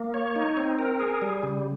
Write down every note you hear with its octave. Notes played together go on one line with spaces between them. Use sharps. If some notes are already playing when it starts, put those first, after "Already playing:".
Already playing: A#3
C#5
D#4
C4
A#4
G#4
G3
C#3